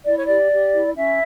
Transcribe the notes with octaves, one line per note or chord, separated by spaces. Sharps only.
E4 D5
C#5
G4 D5
G4
E4
C#4 E4 E5